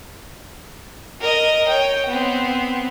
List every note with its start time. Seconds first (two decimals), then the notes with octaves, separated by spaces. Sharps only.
1.21 A#4 D#5
1.68 C#5 G5
2.08 B3 C4